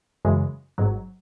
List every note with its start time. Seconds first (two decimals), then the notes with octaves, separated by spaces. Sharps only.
0.25 F#2 C#3 E3 G#3
0.78 G#1 G#2 F#3